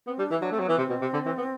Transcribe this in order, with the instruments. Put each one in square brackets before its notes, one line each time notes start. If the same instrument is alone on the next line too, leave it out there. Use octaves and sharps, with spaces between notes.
[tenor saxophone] B3 [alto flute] C4
[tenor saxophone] G3 [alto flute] D4
[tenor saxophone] E3 [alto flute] E4
[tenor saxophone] F#3 [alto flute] D4
[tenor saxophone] A3
[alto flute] C4
[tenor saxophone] F#3
[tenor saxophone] E3 [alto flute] B3
[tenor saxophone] C3 [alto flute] C4
[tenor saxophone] B2
C3
D3
E3
B3